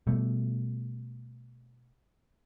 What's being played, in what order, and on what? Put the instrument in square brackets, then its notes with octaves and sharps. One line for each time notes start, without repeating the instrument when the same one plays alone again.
[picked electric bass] B2 G3 A3